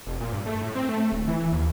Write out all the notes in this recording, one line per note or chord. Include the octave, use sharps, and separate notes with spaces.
F1
A#2
G2
A3
A2
C4
A3
D1
E3
D#2